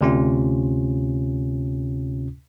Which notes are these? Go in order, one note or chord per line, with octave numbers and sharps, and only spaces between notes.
D2 C3 C#4 F4